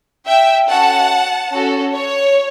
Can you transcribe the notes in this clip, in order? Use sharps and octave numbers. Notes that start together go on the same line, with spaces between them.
E5 G5
C#4 F#4 A4 F#5 A5
C#4 F#4 A4
C#5